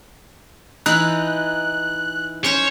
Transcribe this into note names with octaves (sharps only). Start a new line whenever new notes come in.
E3 D#4 E4 F#6
C#4 C5 C#5 G#5